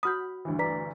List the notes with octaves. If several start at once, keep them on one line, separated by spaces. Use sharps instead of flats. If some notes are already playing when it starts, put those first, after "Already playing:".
F#4 B5 D#6 F6 G6
D2 G2 E3
B4 D5 A#5 B6